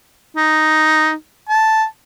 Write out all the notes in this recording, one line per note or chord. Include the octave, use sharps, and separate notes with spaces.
D#4
A5